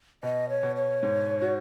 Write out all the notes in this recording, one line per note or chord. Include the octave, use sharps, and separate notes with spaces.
B2 D#5
C#5
B2
C#5
G#2
F#4